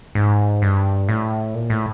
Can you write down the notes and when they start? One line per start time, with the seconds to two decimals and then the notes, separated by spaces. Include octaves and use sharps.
0.15 G#2
0.62 G2
1.09 A2
1.55 A#2
1.70 A2